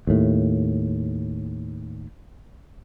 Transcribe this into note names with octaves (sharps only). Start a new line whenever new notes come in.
D#2 A2